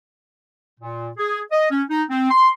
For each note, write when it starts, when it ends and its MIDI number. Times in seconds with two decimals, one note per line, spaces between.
0.80 1.10 46
1.17 1.41 68
1.52 1.70 75
1.71 1.83 61
1.90 2.03 63
2.10 2.28 60
2.30 2.49 84